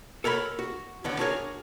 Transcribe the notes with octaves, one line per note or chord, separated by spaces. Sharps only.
A4 A#4 C#5 F5 B5
F#4
B1 A2 D3 A3 B3 F#5
D4 F#4 G#4 A#4 C#5